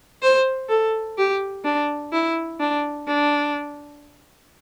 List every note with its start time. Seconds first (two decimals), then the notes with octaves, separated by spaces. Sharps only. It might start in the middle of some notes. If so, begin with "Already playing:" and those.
0.22 C5
0.69 A4
1.18 G4
1.65 D4
2.12 E4
2.60 D4
3.08 D4